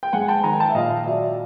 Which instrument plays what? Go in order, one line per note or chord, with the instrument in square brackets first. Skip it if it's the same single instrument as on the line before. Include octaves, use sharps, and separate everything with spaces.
[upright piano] G5
G#2 F#5 G#5
G5 A5
D#3 G#5 A#5
G5 A5
E5
A#2 D#5 F5
F#3 D5 E5